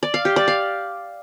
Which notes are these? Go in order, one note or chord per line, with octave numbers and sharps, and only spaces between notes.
D5
F5
G4
D5
F5